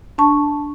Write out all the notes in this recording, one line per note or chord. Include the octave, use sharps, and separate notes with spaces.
D4 A5 C#6